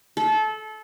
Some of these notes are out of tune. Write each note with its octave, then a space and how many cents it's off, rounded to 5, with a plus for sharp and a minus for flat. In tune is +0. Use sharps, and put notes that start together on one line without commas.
A4 -25